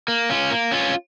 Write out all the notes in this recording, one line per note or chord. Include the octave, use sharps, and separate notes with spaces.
A#3
C#4 F4
A#3
C#4 F4